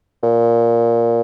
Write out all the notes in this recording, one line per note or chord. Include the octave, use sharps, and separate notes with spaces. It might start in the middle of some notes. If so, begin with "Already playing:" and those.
A#2